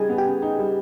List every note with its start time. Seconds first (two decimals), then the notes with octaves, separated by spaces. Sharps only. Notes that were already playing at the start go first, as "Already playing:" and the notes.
Already playing: C#3 G3 D#4 G#4 G#5
0.09 B3
0.18 G4 G5
0.26 C#3
0.42 D#4
0.59 G3